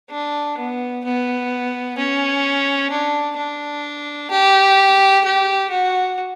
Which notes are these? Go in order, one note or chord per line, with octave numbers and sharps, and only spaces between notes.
D4
B3
B3
C#4
D4
D4
G4
G4
F#4